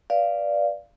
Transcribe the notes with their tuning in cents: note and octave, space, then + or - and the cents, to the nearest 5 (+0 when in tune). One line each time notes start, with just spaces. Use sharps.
B4 +0 D5 +0 F5 -10